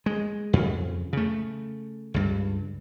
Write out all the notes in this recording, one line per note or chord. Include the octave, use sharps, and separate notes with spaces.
G#3
F2 C#3
C#3 A3
C#2 G2